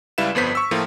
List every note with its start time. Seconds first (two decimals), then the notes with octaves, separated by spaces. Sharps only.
0.18 C#2 G3 E4 B4 F5 E7
0.35 G1 F2 B3 C5 B6
0.55 C#6 E6
0.71 A2 F3 A3 A#3 F4